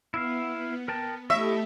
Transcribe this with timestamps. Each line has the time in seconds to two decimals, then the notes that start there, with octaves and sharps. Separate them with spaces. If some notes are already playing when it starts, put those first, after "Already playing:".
0.14 B3 E4 E5 F5
0.88 A#4 G5 A5
1.30 A3 E4 G4 A4 D#5 E5 C#6